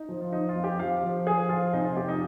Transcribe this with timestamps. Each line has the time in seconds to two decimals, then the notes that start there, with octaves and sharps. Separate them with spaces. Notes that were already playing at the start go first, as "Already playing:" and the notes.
Already playing: D#4
0.09 F3
0.21 F4
0.32 F3 D#4
0.49 F4
0.56 F2
0.64 G4
0.79 F3 F5
1.03 F3
1.27 F3 G#4
1.49 F3 F4
1.73 C3 D#4
1.84 F4
1.96 F2 G4
2.09 D#4